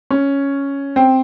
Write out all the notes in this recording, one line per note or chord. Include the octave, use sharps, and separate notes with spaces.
C#4
C4